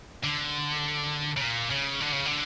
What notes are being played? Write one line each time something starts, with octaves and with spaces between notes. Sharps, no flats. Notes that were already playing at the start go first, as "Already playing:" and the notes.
D3
C#3
A#2
C#3
D3
C#3
D3